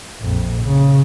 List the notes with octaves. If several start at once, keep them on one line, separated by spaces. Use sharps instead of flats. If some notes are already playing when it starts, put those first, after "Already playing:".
A#1 F2
C#3